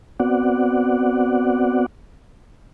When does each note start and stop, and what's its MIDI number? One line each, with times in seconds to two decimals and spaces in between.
0.20 1.86 59
0.20 1.86 60
0.20 1.86 66
0.20 1.86 74
0.20 1.86 78